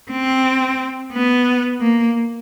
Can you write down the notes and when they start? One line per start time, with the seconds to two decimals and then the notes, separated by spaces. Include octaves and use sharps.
0.11 C4
1.13 B3
1.81 A#3